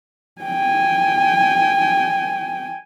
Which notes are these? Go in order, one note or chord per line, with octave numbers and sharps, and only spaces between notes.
G5 G#5